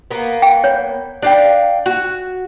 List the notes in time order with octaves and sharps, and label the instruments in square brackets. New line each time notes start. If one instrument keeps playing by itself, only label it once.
[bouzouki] A#3 B3
[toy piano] G5
C#5
[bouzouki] D4 F5 G5
F#4